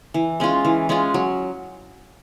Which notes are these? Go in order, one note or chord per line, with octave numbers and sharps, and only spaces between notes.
E3
G#3 C#4 F4
E3
G#3 C#4 F4
F#3